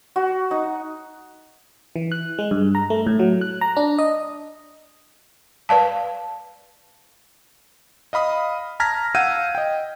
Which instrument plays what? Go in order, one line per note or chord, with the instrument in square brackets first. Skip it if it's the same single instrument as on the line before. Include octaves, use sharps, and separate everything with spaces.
[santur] F#4
D#4
[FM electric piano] E3
F#6
G#3
G2
A#5
A3
A2
F#3
F#6
A#5
D4
D#5
[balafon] B4 D5 F5 A5
[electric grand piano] D#5 F5 B5 D#6
A5 A#5 F6 G#6 A#6 B6
F5 F#5 E6 G6 G#6 D#7
D#5 G5